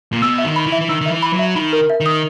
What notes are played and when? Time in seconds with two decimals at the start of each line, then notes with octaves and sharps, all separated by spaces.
0.13 A#2
0.22 B2 E6
0.38 E5
0.44 D#3
0.56 B5
0.66 E3
0.72 E5
0.81 E3
0.89 D#3 E6
1.01 D#3 E5
1.11 E3
1.22 B5
1.33 F#3
1.39 E5
1.56 D#3 B5
1.73 A#4
1.90 E5
2.00 D#3
2.06 D#6